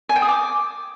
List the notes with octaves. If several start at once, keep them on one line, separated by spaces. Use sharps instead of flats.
G#5
G5
D#6
D6